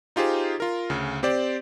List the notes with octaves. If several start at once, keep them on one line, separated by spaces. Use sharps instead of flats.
D#4 F4 G4 G#4 C5
F4 A#4
D2 C#3
C4 G4 C5 D5